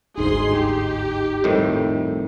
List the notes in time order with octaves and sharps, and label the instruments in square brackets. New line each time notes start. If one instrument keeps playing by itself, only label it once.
[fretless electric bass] G1 D2 G#2 [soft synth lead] D#4 [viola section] G#4 C6
[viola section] G4
[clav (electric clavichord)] F2 A2 D#3 [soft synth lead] G3